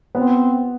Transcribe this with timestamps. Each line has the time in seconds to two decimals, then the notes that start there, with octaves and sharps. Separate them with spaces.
0.15 B3 C4